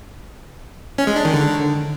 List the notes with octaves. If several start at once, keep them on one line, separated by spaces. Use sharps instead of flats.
C#4
G#3
D4
D#3
D3